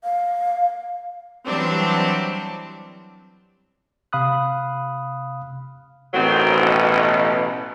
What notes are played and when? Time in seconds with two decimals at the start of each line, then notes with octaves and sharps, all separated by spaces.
0.04 F5
1.47 E3 F#3 G3 C4 D4
4.13 C3 F5 B5 D#6 F#6
6.14 A1 D#3 F#3 C4
6.62 B2